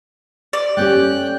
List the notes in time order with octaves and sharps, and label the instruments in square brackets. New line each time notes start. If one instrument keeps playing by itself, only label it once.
[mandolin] D5
[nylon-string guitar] A3 C#4 G4 [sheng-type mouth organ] G5 F#6